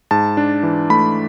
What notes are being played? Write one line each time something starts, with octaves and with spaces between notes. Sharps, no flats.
G#2 A5
D4
E3
A3 B5